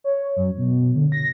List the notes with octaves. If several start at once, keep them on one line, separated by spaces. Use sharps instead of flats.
C#5
F#2
B2
D3
A#6